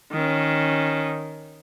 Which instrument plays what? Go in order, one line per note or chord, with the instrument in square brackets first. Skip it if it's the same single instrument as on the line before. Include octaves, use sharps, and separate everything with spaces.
[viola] D#3 C#4